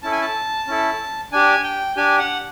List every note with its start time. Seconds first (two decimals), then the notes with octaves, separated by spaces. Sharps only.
0.02 C#4 E4 A4 A5
0.12 G#5
0.21 A5
0.68 C#4 E4 A4
1.32 D4 G4 G#5
1.64 G5
1.96 D4 G4 G#5
2.19 F#5